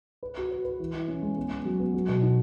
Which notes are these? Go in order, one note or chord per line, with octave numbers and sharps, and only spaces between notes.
B4
F#4
B4
B4
E3
E3
C#4
G#3
B3
B3
F#3
B3
F#3
B2
D#4